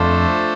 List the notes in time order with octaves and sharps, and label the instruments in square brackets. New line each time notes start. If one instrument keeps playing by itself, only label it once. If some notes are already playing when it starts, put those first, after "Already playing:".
Already playing: [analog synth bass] F2 [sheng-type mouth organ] A3 D4 F4 A4 C5